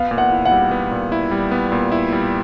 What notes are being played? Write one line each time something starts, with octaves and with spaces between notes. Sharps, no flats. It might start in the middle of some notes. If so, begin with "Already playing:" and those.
Already playing: B3 F5
A#2
F#5
E4
F#5
G3
B3
A#2
E4
G3
B3
A#2
E4
G3